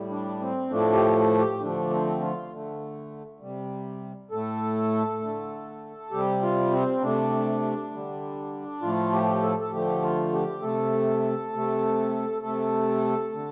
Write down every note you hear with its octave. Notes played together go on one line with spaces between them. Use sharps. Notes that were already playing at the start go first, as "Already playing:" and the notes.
Already playing: A2 G3
D4
C4
A2 F3 A3 D4
G4
G4
D3 F3 A3 D4
C4
F4
D3 A3
C3 G3
A2 A3 A4
D3 A3
C3 G3 G4
F4
C4
C3 A3 D4
D3 G3
A2 F3 A3 F4
G4
A4
A4
D3 F3 A3 G4
F4
G4
C3 A3 A4
C3 A3
C3 A3 A4
D3